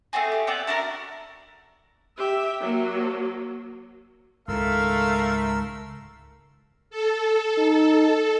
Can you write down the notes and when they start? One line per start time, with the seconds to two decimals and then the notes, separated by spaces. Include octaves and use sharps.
0.13 A3 C4 F#4 G#4
0.32 G4
0.47 B3 C4 D5 E5
0.67 D4 E4 F#4 A#4
2.18 G4 E5
2.60 F#3 A#3
4.48 C#2 G#2 D#3 A3 A#4 F5 C6 E6
6.90 A4
7.58 D#4